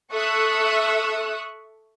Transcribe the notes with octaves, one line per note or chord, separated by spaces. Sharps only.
A4 E5 C#6 D#6 E6 F#6